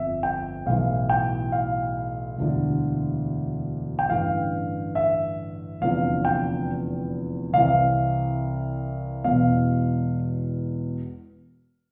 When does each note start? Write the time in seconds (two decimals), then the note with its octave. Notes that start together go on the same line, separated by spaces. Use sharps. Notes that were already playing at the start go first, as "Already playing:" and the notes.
Already playing: G1 F2 E5
0.23 G5
0.66 B1 A2 E3 F5
1.10 G5
1.52 F5
2.38 E1 D2 D3
3.99 G5
4.10 A1 G2 D3 F5
4.95 E5
5.81 F1 E2 D3 F5
6.25 G5
7.53 C2 C3 E3 F5
9.24 E1 E2 B2 F5